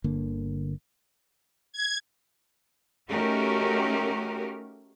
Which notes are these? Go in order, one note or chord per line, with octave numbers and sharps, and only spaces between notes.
G1 D3 A#3
G#6
A3 C#4 D#4 F#4 G4 A#4